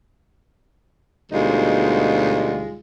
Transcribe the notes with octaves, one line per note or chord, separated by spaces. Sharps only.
D2 B2 G3 G#3 D#4 F4